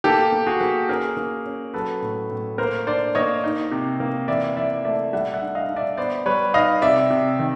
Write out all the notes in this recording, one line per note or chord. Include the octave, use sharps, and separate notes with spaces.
A#3 G4 A4
A#3
F#4 G#4
A#3
C#4 G#4 A#4
A#3
C#4
F#3 A4 B4
A2
A2
A#3 A#4 C5
D4 C5 D5
A#3 C#5 D#5
D#4
C3
A#3
E3 D5 E5
E3 D5 E5
A3 D5 E5
G3 E5 F#5
E5 F#5
D4
D#5 F5
D4
D5 E5
B3 C5 D5
G3 B4 C#5
D#4 D#5 F5
C3 D5 E5
C3
D#3